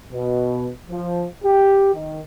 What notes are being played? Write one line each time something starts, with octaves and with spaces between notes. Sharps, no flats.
B2
F3
G4
D#3